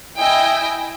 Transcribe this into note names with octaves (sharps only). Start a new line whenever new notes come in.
E4 D#5 G5 G#5